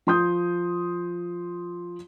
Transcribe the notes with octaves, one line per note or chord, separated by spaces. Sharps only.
F3 F4 C6 D#6 G6